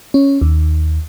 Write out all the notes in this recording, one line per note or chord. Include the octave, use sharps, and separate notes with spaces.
C#4
D#2